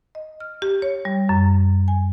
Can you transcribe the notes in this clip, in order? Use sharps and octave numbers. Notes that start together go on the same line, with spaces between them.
D#5
F6
G4
C#5
G3
F#2
G#5